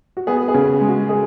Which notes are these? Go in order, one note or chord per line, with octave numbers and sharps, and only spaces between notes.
F#4
B3 G#4
G#4
C#3
G#3
F#4
G#4